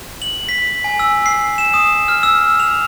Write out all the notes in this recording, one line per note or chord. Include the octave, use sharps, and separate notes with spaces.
F#7
B6
G#5
E6
C7
E7
D#6
F6
E6
F7